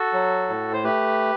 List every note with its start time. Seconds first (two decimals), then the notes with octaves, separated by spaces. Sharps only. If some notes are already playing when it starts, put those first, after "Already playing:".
Already playing: F#4 A4
0.13 F#3
0.49 A2
0.73 C5
0.84 A3 G4 B4